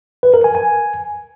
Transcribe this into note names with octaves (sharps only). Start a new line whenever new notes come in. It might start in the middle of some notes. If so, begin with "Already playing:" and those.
B4
A#4
G#5
G#5